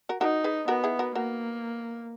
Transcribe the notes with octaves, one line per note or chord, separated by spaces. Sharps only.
F#4 A#4
D#4 F#4 A#4
G#4 B4
B3 F#4 A#4
E4 G#4
F#4 A#4
A#3 F#4 A#4